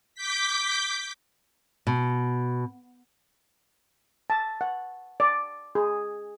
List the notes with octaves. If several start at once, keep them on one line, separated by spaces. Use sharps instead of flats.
D6 G6 B6
B2
A5
F#5
D5
G#4